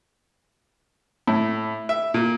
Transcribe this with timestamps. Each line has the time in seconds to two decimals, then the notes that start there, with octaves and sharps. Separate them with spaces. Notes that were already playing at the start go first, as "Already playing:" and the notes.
1.27 A2
1.89 E5
2.14 A#2